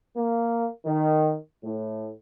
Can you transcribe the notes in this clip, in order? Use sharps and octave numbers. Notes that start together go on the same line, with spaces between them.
A#3
D#3
A2